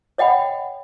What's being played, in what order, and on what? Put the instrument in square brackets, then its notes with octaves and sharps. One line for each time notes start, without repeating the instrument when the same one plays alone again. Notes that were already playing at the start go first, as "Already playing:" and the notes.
[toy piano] C#5 D#5 F#5 G5 B5